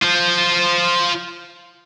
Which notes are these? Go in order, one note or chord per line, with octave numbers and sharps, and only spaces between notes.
F4 C5